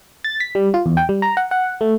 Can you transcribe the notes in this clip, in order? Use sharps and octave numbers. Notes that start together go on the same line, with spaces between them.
A6
B6
G3
F4
E2
G5
G3
A#5
F#5
F#5
A3